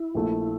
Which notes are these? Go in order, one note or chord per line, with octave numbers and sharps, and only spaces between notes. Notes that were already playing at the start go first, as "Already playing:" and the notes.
Already playing: E4
A#1 A#2 A3